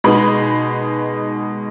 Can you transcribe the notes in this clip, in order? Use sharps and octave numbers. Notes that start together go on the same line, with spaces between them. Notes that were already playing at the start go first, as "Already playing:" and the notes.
B2 G#3 B3 D#4 B5